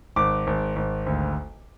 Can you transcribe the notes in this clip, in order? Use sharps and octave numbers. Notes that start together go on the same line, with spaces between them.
G#1 D6
G#1
G#1
D2